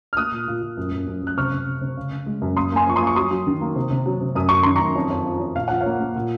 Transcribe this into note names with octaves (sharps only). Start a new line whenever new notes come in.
F6
A#3 D#6 F#6
A#2
A#2
A#2
F#2
F#2
F#2
F#2 F#6
C3 C#6 F6
C3
C3
C3
C#3
C#3
G#3
F#2
A#3 C6 D#6
A#3 G#5 C6
F3 C#6
C6 D#6
A#3
C#6
F#3 C6 D#6
F#3
D#3
A#3
C3
C3
F#3
C3
F#2 D#6
F#2 C#6
D#3 C6
A#5 C#6
F#2
F2
F2
F3
F2
A#2 F5
F3 F#5
C#5 F5
A#3
A#3
A#2